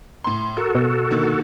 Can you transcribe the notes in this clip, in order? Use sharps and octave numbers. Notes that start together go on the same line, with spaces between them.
A2 C6
F#4 A4 A#4
B2
D3 D#3 A#3